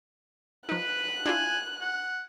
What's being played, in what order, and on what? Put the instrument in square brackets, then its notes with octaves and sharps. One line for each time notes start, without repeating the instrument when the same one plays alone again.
[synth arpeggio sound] F3 D#4 [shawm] B4 [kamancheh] F#6
[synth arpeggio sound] D4 E4 F4 [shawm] G#5
[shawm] F#5